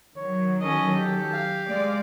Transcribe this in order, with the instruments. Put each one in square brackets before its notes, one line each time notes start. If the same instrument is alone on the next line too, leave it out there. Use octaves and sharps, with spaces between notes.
[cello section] D#3 F#3 [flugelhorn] C#5
[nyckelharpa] C#4 D#5 [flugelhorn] A4
[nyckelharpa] G4
[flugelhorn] F5
[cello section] G#3 D5